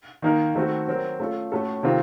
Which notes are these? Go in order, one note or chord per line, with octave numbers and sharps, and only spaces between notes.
D#3 A#3 D#4 A#4
D#3 A3 C4 F#4 A4
F#3 C4 F#4 A#4
A3 C#4 F4 A4
A2 A3 C#4 F#4 A4
C3 D#3 A3 C4 F4